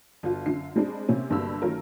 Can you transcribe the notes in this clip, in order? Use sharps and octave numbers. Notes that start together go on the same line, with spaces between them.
G1 F4 F#4
F#2 D3 F4 C7
G3 G#3 C4 D4
C3 A#3 C4 C#4
G1 G2 F#3 G3 A#3 E6
D#3 F#3 A3 C#4 F4 A#4